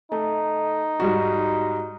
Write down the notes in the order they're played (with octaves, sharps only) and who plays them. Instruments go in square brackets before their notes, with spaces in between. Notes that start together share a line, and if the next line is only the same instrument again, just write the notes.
[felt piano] A3 [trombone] D#4
[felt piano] G#2 G3 F#4